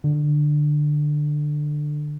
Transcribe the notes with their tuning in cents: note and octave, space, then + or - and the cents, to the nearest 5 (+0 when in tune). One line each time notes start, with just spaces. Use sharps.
D3 +15